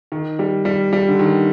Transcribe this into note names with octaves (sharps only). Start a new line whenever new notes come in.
D#3
G3
G3
G3
D3
D#3